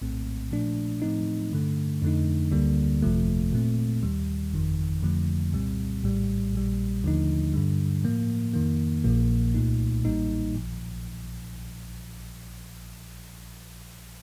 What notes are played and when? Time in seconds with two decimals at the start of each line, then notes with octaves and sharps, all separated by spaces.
0.01 A#1 A2 A3 C4
0.51 A#2 F3 A3 D4
1.02 A2 F3 A3 C4 D#4
1.51 G2 D3 A3
2.02 F2 D3 A3 D#4
2.52 D2 D3 G3 A#3 D4
3.02 G1 F2 C3 F3 A3
3.53 A#2 A3 C4
4.03 D#2 D#3 G3
4.53 G1 F2 D#3
5.03 F2 D3 F3 A3
5.53 C2 A#2 G3 C4
6.03 A#1 A2 G3
6.53 A#1 A#2 G3
7.04 D#2 D3 F3 A3 D#4
7.54 G2 D3 G3
8.04 A2 F3 A#3
8.54 F2 D#3 A#3
9.04 A#1 A#2 F3 A#3
9.54 C2 A#2 A3 D#4
10.04 A1 A2 G3 A#3 D#4
10.54 A#1 A#2 F3